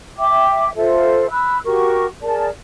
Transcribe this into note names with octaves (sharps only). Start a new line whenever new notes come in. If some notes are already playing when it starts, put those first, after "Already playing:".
E5 G5 D6
F4 A4 C5 E5
B5 E6 F#6
F#4 G4 A#4 C#6
G#4 A#4 D5 A5